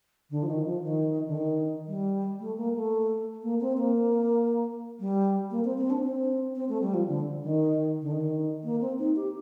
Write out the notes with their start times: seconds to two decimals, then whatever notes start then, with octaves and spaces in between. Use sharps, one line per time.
0.30 D3
0.43 F3
0.48 D#3
0.65 F3
0.84 D#3
1.27 D3
1.35 D#3
1.87 G3
2.40 A3
2.57 A#3
2.74 A3
3.43 A#3
3.61 C4
3.78 A#3
5.00 G3
5.51 A#3
5.65 C4
5.78 C4
5.90 D4
6.03 C4
6.56 C4
6.69 A3
6.82 G3
6.94 F3
7.08 D3
7.43 D#3
8.02 D3
8.11 D#3
8.64 A#3
8.81 C4
8.99 D#4
9.16 G4